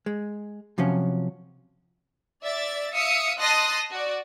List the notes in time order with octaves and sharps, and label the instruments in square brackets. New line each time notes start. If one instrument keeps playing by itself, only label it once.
[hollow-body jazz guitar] G#3
C3 F3 F#3 C#4
[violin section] D5 E5 A6
E5 F5 D#6 E6 C#7
D#5 A5 C6 D#6 F#6 A#6
F#4 D5